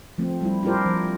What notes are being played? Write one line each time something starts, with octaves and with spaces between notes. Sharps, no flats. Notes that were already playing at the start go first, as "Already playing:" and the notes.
F3 A3 C4
G3 E4
D4 E4 F4 G4 A#4 C5
F3